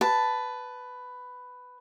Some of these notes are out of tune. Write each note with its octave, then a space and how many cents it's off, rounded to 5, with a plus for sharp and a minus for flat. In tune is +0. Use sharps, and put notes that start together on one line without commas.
B4 +10 A5 +0